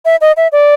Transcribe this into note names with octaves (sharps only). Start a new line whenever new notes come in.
E5
D#5
E5
D5